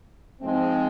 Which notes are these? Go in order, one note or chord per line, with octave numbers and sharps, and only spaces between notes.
G#2 F3 G#3 C4